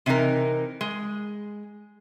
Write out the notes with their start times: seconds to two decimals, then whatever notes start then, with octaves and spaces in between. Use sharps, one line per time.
0.06 C3 E3 D4 D#4 A#4
0.81 G#3